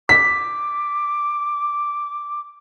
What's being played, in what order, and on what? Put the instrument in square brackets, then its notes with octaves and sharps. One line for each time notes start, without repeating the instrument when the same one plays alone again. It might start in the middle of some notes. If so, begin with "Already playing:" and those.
[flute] D6 [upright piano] B6